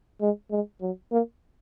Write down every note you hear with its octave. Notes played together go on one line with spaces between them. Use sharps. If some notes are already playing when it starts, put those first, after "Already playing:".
G#3
G#3
F#3
A#3